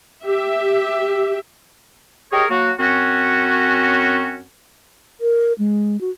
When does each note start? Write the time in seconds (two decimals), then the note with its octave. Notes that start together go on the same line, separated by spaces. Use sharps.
0.24 G4 E5
2.32 G4 G#4 A#4 C#5 D#5
2.49 F#3 A#3 F#4
2.79 F#2 C4 C#4 F#4
5.21 A#4
5.59 G#3
6.01 F#4